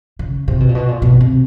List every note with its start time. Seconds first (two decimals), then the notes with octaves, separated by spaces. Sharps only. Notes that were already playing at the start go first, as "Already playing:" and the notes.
0.19 C#3
0.48 C3
0.60 B2
0.69 A#2
0.75 B2
0.88 A#2
1.02 B2
1.21 C3